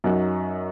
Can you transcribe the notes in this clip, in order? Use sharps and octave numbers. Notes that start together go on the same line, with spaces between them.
F#2 F#3 D#4 F#4